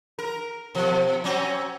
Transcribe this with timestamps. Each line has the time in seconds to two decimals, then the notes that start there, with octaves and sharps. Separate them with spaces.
0.19 A#4
0.75 B2 F3
1.24 F#3 C4 C#4